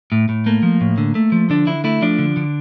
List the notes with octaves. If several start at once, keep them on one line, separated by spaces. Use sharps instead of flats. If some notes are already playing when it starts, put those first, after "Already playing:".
A2
A2
A3 A#3
F3
A2
D3
A3
F3
D3 D4
D3 E4
A3 E4
F3 D4
D3
D3